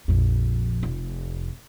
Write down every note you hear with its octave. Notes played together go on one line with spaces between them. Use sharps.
A#1 F2
F1